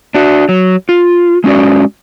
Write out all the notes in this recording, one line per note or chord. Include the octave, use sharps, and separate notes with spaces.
D4 F#4
F#3
F4
G#3 C#4 F#4 D5